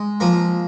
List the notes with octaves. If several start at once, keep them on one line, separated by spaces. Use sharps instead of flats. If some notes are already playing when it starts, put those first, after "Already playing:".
Already playing: G#3
F3 A#3